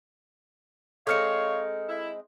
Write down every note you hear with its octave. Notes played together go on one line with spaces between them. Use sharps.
G#3 C4 D#4 A4 C#5 F5 F6 C#7
E4